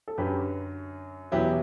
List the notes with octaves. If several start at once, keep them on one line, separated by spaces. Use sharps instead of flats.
A4
F#2 D3 F#3 G4 B4
E2 B2 F#3 E4 G4